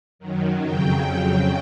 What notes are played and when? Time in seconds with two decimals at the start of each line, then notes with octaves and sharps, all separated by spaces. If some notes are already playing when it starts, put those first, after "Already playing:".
0.19 F#2 D#3 F#3
0.62 F2 C#3 F#3 G5